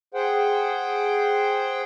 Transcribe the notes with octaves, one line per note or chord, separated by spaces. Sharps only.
G#4 C5 F#5 G5